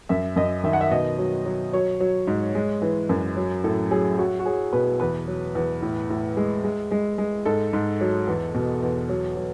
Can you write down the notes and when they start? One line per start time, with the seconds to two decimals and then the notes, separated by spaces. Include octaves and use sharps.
0.09 F#2 E5
0.36 F#2 D#5
0.64 D#3 E5
0.73 F#5
0.81 E5
0.91 B2 D#5
1.18 F#3
1.46 F#3
1.73 F#3 C#5
2.00 F#3
2.27 G#2
2.55 G#3
2.82 E3
3.09 F#2
3.37 F#3
3.64 A2 A4
3.91 F#3 G#4
4.18 F#3 F#4
4.39 F#4
4.46 F#3 G#4
4.73 B2 B4
5.00 E2 B4
5.28 F#3
5.55 E2
5.82 A2
6.10 A2
6.37 G#3
6.64 G#3
6.91 G#3
7.18 G#3
7.45 G#2 A4
7.73 G#2
8.01 F#3
8.27 E2
8.55 B2
8.82 E2
9.09 F#3
9.37 F#3